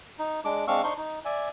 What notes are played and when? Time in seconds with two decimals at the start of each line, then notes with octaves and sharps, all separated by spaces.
0.19 D#4
0.45 G#3 D4 D6
0.68 G#3 C4 D4 F5 C#6 E6
0.84 D4 D#4 C5 C6 C#6
0.97 D#4
1.25 D5 E5 G#5